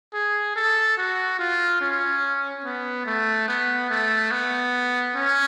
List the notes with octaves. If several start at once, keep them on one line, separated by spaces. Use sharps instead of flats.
G#4
A4
F#4
F4
C#4
B3
A3
B3
A3
B3
C#4